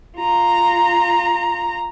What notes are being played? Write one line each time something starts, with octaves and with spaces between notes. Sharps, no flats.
F4 A#5